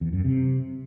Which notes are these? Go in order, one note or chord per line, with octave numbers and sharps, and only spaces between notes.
E2
F#2
C3